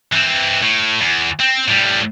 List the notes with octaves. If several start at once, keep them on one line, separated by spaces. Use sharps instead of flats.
E3 C4
A2
E2
C4
A2 G3